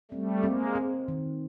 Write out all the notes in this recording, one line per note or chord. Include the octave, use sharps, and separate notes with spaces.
G3 A3 C4
G#3 A#3 C4
C4
D#3